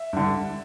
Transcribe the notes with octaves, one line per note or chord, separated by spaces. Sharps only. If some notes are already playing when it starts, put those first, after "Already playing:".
Already playing: E5
G2 D3